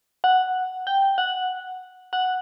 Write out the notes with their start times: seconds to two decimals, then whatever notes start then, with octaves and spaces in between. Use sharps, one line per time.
0.24 F#5
0.87 G5
1.18 F#5
2.13 F#5